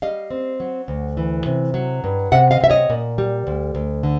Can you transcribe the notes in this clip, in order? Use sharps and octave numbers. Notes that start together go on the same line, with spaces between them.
G3 D#5 F5
C4
F#3
D2
E3
C3
F#3
G2
C3 E5 F#5
D#5 F5
C3 E5
C#5 D#5
A#2
G3
D2
D2
D3